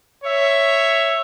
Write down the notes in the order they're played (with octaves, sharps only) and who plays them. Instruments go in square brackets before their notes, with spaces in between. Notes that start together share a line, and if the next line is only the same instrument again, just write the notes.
[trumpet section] C#5 E5